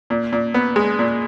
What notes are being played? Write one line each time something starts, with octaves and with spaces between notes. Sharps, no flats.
A#2
A#2
B3
G#3
A#2